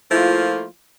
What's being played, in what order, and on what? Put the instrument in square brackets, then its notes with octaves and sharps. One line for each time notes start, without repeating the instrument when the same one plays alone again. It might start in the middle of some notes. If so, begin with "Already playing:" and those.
[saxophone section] F3 A3 A#3 E4 F4